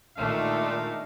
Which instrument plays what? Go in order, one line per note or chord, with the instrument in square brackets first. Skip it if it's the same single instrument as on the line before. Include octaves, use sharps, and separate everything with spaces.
[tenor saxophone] A#2 [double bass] D#3 D4 [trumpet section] G#3 D#4 F5 [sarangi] A3